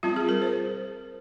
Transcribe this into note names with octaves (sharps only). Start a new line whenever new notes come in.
G3 C4 F4
G#4
A#4
C5